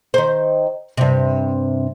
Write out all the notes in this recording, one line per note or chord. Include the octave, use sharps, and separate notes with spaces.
D#3 C5
G2 C3